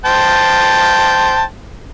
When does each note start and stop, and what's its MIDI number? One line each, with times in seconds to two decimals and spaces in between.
0.05 1.42 72
0.05 1.42 79
0.05 1.42 81